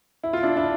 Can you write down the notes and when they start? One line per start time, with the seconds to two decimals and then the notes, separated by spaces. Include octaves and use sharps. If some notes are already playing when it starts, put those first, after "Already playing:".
0.24 E4
0.33 F4
0.43 D4 E4
0.56 D4 E4